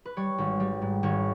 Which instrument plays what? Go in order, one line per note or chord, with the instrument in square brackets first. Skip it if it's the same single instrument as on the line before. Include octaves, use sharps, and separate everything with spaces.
[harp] B4
G3 C#5
G#1
G3
G#2
G#1 C#5